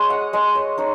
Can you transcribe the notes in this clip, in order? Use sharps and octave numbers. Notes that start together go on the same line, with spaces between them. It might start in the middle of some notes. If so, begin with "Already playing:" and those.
Already playing: G#3 C#5 D#5
F#5
G#3 D#5
C#5
D#4 C#5